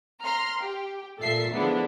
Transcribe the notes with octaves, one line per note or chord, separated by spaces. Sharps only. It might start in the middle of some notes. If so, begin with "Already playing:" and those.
A#5 C6 F6
G4
A#2 A4 E5 C7
D3 F3 G#3 B3 D4 E4